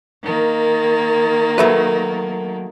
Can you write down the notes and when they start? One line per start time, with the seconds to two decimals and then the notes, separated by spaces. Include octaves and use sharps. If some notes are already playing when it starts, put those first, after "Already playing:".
0.23 D#3 A#3
1.58 F#3 A3 B4